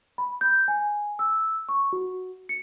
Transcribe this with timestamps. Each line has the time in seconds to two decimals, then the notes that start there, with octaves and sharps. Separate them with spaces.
0.18 B5
0.41 G6
0.68 G#5
1.19 E6
1.69 C#6
1.93 F#4
2.49 C#7